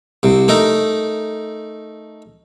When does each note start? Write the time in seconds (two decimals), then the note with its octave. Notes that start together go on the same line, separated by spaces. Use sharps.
0.23 C2 C3
0.48 A3 D#4 A#4